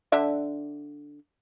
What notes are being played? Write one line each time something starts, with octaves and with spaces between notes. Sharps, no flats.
D3 D4 E5